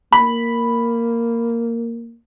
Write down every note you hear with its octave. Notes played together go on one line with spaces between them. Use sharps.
A#3 B5